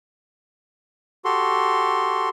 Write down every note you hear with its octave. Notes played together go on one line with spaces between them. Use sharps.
F#4 G4 A4 C6